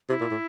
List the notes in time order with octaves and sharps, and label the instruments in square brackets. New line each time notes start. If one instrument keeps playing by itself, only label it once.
[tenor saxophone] C3 [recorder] E4
[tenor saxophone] A#2
A2